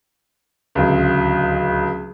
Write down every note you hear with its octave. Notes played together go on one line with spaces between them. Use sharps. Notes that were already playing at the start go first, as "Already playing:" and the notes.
D1 C#2